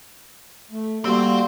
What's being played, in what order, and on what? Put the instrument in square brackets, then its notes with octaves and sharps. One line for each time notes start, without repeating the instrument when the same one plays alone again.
[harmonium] A3
[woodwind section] G3 A#3 [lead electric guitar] C4 C5 [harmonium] F#4